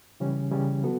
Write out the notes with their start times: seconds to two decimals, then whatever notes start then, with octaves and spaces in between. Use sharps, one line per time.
0.20 C#3 E3 G3 C#4
0.51 C#3 E3 G3 C#4
0.82 F#3 B3 F#4 A4